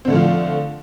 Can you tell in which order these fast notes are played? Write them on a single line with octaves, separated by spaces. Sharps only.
C4 D3 A3 F3 F4